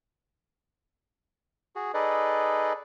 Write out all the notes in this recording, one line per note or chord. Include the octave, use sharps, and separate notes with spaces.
F#4 G#4
D#4 G#4 A4 B4 D5 D#5